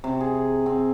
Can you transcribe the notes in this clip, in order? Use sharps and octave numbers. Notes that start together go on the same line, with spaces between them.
C3
G#4
C4